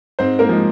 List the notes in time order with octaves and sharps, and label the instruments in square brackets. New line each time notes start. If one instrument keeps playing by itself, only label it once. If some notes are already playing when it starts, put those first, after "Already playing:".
[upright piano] G#2 C4 C5
A#3 A#4
F3 G#3